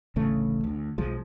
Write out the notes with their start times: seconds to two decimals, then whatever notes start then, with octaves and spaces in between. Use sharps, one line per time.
0.16 D1 A1 C#3 A3
0.64 D2
0.98 B1 F3 G#3